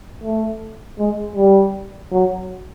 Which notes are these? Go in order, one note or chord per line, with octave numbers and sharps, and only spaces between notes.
A3
G#3
G3
F#3